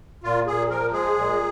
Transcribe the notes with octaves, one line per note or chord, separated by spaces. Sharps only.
A#2 F4
A#2 G#4
F3 A#4
G#3 G#4
A#2